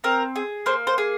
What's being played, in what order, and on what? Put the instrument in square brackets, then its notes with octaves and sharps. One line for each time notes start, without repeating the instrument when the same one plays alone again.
[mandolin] C4 A#4
G#4
A#3 C5
C5
G#4